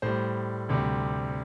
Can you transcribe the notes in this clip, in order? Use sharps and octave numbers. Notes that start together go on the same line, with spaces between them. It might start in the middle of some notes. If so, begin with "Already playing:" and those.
A2 G3 C5
D2 C3 G3